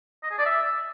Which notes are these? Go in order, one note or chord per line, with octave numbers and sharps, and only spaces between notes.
D#5
G#4
D5
E5